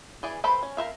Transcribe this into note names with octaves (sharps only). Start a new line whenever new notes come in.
E3 G#4 D5
G4 A4 B4 C5 B5
C#4
A#4 C5 E5 F5